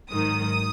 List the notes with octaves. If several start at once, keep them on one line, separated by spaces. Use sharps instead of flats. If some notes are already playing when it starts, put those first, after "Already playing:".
G#2 D#3 F#3 D#6